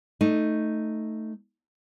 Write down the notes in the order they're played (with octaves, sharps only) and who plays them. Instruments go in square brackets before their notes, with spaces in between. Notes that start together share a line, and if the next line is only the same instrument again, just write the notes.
[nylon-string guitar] A3 D#4